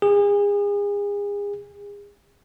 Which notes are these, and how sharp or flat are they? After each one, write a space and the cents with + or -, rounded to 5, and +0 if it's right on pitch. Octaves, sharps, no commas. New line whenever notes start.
G#4 -35